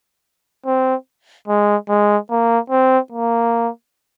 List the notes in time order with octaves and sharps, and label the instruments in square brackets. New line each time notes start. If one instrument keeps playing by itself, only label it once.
[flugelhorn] C4
G#3
G#3
A#3
C4
A#3